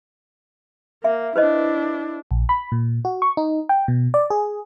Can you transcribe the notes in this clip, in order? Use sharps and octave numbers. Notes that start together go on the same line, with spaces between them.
A#3 E5
D4 E4 B4 C5 D#5
A#1
B5
A#2
F#4
C#6
D#4
G5
B2
D5
G#4